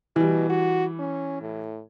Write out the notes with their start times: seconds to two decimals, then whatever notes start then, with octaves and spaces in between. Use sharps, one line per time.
0.16 B2 E3 G3
0.49 F#4
0.99 C#4
1.42 A2